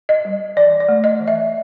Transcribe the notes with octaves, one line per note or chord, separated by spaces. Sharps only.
D#5
G3
E3 D5
D5
A3
D#5
E3
E5